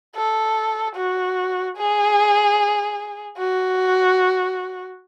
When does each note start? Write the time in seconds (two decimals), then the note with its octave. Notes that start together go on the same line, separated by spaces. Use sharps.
0.16 A4
0.96 F#4
1.77 G#4
3.38 F#4